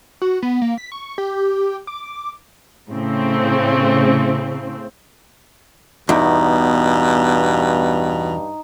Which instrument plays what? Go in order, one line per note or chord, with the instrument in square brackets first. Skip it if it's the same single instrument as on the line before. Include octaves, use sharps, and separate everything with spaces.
[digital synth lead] F#4
B3
A#3
B6
C#6
G4
D6
[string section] A2 C#3 C4
[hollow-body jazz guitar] E2 [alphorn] G2 [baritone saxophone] B2 [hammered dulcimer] D#4